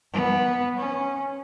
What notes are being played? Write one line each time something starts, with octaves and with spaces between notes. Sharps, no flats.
B3
C#4